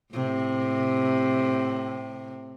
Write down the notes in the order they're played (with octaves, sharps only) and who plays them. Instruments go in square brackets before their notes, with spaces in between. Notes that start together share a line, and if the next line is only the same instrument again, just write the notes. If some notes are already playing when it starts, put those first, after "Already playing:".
[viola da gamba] A2 C3